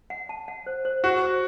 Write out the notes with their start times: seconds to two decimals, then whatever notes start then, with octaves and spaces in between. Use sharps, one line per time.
0.10 F#5
0.29 A5
0.48 F#5
0.66 C5
0.85 C5
1.04 F#4 F#5
1.22 C5